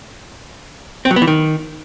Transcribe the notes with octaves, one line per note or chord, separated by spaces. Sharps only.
C4
F#3
B3
E3
D#3